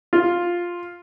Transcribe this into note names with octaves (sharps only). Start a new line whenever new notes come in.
F4